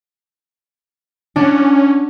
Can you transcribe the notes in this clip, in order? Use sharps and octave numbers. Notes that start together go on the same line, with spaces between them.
C#4 D4 F#5